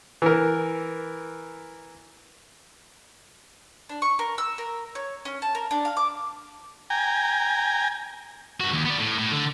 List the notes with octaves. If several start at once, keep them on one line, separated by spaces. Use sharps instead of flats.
E3 A#4
D4
C#6
A#4
E6
A#4
C#5
C#4
A5
A#4
D4
F5
D6
G5 G#5 A#5
G2 F#4
D#2
B3 D5
A2
A2
D3